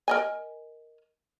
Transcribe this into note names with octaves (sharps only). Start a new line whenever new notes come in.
A#4 D#5 G#5